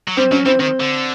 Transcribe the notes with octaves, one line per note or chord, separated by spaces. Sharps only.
F#3
G3 C4
F#3 C#4
E3 C4
D#3 C4
D3